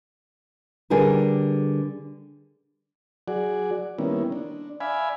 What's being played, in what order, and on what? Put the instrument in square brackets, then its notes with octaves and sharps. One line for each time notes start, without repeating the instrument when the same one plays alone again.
[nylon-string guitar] D3 G3 G#4 A#4 B4
[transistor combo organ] F#3 F#4 G#4 D5
D#3 G3 A#3 B3 C#4 E4
D4
D5 E5 F5 G#5 B5